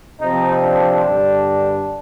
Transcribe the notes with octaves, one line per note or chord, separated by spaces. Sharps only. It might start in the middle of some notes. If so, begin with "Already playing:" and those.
C3 F3 C4 D#4
D4
G2 D3 G3